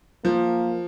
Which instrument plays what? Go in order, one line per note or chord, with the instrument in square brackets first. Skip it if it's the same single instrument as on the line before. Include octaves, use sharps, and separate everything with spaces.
[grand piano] F3 [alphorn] A#3